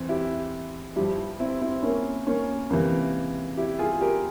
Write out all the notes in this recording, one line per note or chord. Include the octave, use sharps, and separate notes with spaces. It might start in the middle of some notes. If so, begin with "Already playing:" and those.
Already playing: E2 E3 C4
E4 G4
G2 F3 E4 G4
C4 E4
C4 E4
A#3 C#4
A#3 C#4
C#2 C3 E3 A#3
E4 G4
F4 G#4
G4 A#4